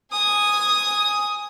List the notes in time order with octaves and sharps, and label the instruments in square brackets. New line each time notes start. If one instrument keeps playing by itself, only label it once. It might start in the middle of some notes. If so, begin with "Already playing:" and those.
[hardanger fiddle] G#5 D#6